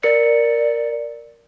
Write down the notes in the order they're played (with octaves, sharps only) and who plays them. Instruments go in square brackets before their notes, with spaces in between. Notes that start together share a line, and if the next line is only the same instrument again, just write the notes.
[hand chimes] A#4 C#7 [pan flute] D5